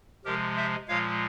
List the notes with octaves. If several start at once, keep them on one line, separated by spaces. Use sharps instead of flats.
C3 F3 G#3 G4 A#4
C5 E5
A#2 F3 G#3 C#5 F5